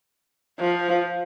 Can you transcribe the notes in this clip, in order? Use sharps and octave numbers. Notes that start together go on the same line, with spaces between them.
F3